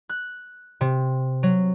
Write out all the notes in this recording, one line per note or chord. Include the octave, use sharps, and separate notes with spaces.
F#6
C3
F#3